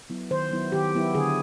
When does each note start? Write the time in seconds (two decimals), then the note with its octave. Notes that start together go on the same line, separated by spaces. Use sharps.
0.10 F#3 B3 E4
0.31 D#3 C5
0.51 F#3 B3 E4
0.72 D#3 G4
0.94 F#3 B3 E4
1.15 D3 G#4